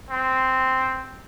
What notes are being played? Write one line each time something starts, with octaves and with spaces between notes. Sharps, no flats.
C4